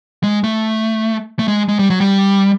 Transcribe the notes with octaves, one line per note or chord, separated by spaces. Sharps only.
G#3
A3
A3
G#3
G#3
G3
F#3
G3